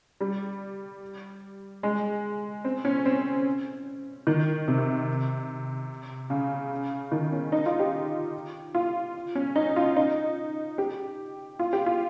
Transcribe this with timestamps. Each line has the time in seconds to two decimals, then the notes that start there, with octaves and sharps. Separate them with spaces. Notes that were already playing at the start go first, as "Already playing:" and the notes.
0.21 G3
1.83 G#3
2.64 C4
2.85 C#4
3.05 C4
4.27 D#3
4.68 C3
6.30 C#3
7.12 D#3
7.32 C#4
7.52 D#4
7.66 F4
7.80 G4
8.74 F4
9.35 C#4
9.56 D#4
9.76 F4
9.96 D#4
10.78 G4
11.59 F4
11.73 G4
11.86 F4